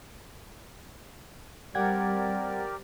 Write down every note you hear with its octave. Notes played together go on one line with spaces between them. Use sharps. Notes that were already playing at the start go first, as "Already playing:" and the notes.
G3 C4 G4 A#4 D5 F#5 G5 G#6